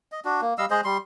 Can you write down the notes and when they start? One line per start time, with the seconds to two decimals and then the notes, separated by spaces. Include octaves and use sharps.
0.12 D#5
0.25 D4 F#4
0.41 A#3
0.58 G3 D#5 F5 E6
0.70 G#3 G#4 C5 D#5
0.84 G3 C6